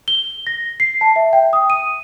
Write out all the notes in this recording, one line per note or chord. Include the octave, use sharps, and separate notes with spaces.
G7
A#6
C7
A5
E5
G5
D#6
D#7